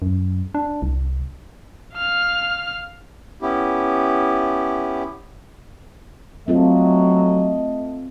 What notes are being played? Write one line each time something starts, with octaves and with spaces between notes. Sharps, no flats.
F#2
D4
C2
F5 F6
B3 C#4 E4 G4
F#3 A3 C4 F4 A4 D#5